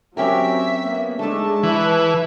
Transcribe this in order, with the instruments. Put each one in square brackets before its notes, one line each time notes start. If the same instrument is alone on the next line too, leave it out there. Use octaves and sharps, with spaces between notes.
[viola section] F#3 C4 [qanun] C#4 G4 A#4 [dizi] E5
[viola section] A#3 B3
[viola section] G#3 D4 D#4 [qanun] A3 E5 [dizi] A5
[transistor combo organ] E3 [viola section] B4